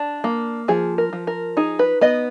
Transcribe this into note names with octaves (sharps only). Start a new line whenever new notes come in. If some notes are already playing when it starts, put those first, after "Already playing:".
Already playing: D4
A#3
F3 G#4
A#4
F3
A#4
D#4 G#4
B4
B3 D#5